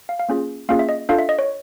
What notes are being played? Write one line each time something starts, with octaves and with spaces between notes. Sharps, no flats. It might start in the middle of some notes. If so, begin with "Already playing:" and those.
F5
F5
A#3 C#4 F4 G#4
A#3 C#4 F4 G#4 F5
E5
D#5
D4 F4 A4 F5
E5
D#5
C#5